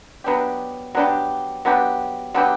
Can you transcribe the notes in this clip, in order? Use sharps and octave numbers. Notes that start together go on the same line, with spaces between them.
F#3 B3 D4 G4
F#3 B3 D4 G4
F#3 B3 D4 G4
F#3 B3 D4 G4